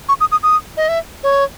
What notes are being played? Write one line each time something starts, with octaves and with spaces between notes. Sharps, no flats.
C#6
D#6
D#6
D#6
D#5
E5
C#5